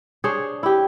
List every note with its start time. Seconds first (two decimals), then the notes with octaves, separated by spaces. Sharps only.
0.24 D4 G#4 C5 C#5
0.63 E4 G4